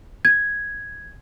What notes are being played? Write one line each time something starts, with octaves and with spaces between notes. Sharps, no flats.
G#6